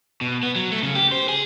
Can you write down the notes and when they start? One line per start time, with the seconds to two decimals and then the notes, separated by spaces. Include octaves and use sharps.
0.21 B2
0.43 B3
0.56 F#3
0.71 A3
0.83 C#3
0.95 G4
1.12 C5
1.28 G#4